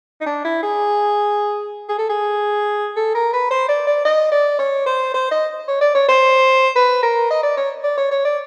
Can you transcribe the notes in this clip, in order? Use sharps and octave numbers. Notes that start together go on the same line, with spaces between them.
D#4
D4
E4
G#4
G#4
A4
G#4
A4
A#4
B4
C5
D5
D5
D#5
D5
C#5
C5
C5
D#5
C#5
D5
C#5
C5
B4
A#4
D#5
D5
C#5
D5
C#5
C#5
D5